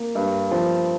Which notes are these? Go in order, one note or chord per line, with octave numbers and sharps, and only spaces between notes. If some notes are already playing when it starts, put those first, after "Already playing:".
Already playing: A#3
G2
F3